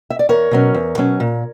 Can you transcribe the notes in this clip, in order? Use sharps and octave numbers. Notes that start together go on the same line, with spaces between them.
E5
D5
E2 A#4 C#5
B2 F#3 C#4
E2
B2 F#3 C#4
A#2